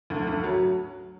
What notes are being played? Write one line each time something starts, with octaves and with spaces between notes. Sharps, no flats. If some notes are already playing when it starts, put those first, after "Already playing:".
D2
D2
F#3